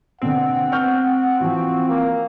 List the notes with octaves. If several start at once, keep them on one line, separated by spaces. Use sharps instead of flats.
B2 D3 C4 F#5
C#6 F6 G6
E3 F3 F#4
A#3